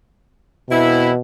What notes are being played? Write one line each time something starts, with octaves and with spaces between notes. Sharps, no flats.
B2 E3 C4 E4